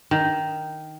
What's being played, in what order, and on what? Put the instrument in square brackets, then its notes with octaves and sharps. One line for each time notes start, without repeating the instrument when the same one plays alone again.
[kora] D#3